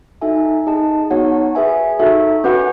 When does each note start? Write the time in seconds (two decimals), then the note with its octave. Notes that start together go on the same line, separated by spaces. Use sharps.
0.21 D#4 F#4 A4 E5 G#5
0.66 D#4 G#4 D#5 A5
1.10 B3 D#4 F#4 C#5 F#5
1.55 G#4 B4 E5 G#5
1.99 D#4 F#4 A4 E5
2.44 C#4 F#4 B4 F#5